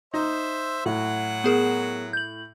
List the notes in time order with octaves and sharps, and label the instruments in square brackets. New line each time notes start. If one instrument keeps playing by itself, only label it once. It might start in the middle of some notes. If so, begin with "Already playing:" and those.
[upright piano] D#4 [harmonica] C5 E5
[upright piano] A2 [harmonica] F#3 F#4 F#5
[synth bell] B3 G#4 A#4
G6 F#7